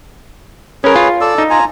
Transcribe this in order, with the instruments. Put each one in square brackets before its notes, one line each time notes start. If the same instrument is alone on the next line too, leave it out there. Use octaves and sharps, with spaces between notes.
[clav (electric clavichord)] C#4 A#4 [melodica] G#4 B4 C#5
[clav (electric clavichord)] F4
[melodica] A4 D5 E6
[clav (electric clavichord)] D#4
[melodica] F4 G#5 A#5